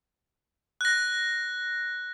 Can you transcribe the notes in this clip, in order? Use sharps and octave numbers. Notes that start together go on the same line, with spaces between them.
F#6 A#6